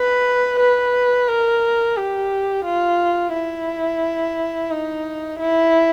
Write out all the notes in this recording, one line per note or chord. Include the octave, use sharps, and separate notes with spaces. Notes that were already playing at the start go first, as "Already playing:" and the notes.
Already playing: B4
B4
A#4
G4
F4
E4
D#4
E4